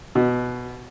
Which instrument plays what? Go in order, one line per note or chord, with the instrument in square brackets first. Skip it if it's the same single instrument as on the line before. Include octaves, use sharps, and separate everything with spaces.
[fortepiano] B2